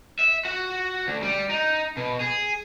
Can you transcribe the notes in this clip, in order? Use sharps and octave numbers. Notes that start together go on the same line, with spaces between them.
E5
F#4
D2
G3
D#4
B2
G#4